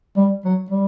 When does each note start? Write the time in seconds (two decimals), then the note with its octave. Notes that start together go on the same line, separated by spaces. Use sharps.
0.17 G3
0.45 F#3
0.70 G3